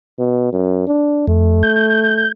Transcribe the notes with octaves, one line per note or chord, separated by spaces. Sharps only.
B2
F#2
D4
F2 A3
G6